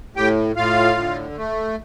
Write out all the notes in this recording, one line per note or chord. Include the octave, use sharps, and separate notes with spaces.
A2 G4 G5
A2 F4 F5
D3
A3